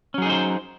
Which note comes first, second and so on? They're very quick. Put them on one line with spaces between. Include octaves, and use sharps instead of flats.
C#4 F#3 G#4 D#4 C5